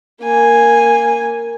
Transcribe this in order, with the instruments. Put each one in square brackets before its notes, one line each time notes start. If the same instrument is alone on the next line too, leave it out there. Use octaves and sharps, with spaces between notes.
[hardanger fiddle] A#3 G#5